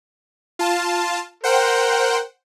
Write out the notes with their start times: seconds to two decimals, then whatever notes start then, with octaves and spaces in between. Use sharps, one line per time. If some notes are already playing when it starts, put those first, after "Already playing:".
0.59 F4 A5
1.44 A#4 C5 F#5 G5